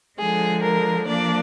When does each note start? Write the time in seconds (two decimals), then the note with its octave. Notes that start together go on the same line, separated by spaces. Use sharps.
0.18 D3 F3 G#3 G#4
0.62 A#4
1.06 F3 A#3 D4 D5